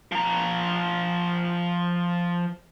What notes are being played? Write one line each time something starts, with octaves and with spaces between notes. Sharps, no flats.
F3 A#5